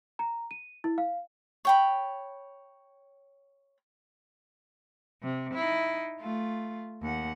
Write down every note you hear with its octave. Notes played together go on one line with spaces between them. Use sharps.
A#5
D#7
E4
F5
C#5 G5 B5
C3
D#4 E4
A3 F4
D#2 F#5